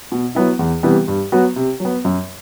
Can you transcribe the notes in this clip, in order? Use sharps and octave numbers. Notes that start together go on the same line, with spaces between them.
B2
F#3 B3 E4
E2
C3 E3 G3 B3
G2
F#3 B3 F#4
C3
F#3
B3
F#2